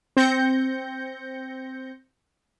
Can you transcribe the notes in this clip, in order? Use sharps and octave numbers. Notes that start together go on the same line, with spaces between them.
C4 G6 A#6 C#7